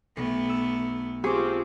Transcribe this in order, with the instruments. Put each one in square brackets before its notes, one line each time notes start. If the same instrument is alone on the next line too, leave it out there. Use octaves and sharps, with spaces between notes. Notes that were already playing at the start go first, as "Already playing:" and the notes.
[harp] B1 [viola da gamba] A3 B3
[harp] E6
[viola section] F3 C4 G4 [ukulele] G#4 [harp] C#6 D6